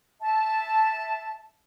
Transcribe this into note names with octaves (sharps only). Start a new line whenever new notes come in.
E5 A5